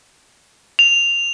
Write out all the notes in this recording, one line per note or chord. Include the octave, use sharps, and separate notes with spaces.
F7